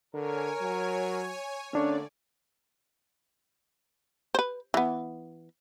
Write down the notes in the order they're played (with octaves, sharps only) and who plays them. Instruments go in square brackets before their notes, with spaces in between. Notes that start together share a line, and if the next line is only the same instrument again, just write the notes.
[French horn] D3 [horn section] A#4 [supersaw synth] C#5 G#5
[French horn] F#3
[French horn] D3 [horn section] A3 A#3 [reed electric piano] C#4 D4 C#5 [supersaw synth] D5
[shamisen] B4 C5
E3 B3